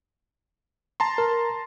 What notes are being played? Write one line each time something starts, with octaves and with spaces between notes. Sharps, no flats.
A5 A#5 C6
A#4